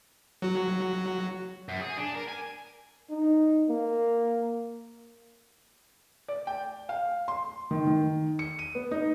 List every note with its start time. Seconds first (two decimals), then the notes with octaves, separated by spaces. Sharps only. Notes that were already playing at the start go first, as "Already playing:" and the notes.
0.42 F#3 F#4
1.68 F#2
1.81 G#4
1.97 D4
2.15 A#4
2.28 G#5
3.10 D#4
3.69 A#3
6.28 D5
6.47 G5
6.89 F5
7.28 C6
7.71 D#3
7.87 D#3
8.39 C#7
8.59 D#7
8.75 B3
8.91 D#4